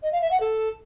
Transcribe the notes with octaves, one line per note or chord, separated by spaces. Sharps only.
D#5
F5
E5
F#5
A4